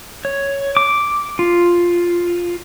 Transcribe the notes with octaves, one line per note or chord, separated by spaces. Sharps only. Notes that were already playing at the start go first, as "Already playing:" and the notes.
C#5
D6
F4